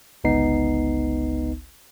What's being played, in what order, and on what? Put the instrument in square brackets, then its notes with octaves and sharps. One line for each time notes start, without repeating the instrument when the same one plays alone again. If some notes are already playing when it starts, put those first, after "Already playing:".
[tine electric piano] G1 C#2 B3 D#4 C7